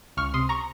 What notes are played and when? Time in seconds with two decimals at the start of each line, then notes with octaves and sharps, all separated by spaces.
0.17 C#2 C#6 F6
0.33 C3 C6 D#6
0.49 A#5 C#6